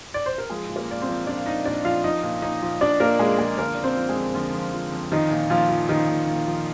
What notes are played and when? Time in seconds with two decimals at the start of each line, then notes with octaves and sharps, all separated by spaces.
0.14 D5
0.26 C5
0.38 A#4
0.50 F3 G#3 G#4
0.69 A#2
0.76 A#3 A#4
0.89 A#2 D5
1.01 C4 C5
1.08 F3
1.27 F3 D4 D5
1.37 F5
1.46 A#2 D#4 D#5
1.65 A#2 D4 D5
1.84 F3 F4 F5
2.04 F3 D#4 D#5
2.23 A#2
2.42 A#2 D#4 D#5
2.62 F3
2.81 F3 D4 D5
3.00 A#2 A#3 A#4
3.19 A#2 G#3 G#4
3.38 F3 G#3 G#4
3.57 D3 A#3 A#4
3.75 F2 D5
3.83 C4 C5
3.96 F3
4.09 G#3 G#4
4.16 F2
4.35 D3 F3 F4
4.54 F2
4.73 F3
4.92 F2
5.12 D#3 F3 D#4
5.31 A#2
5.50 A#2 F3 F4
5.69 F3
5.89 D#3 F3 D#4
6.08 A#2
6.27 A#2
6.47 F3